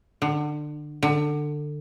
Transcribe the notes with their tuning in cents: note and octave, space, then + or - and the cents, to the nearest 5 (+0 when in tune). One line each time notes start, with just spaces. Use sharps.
D3 +25
D3 +20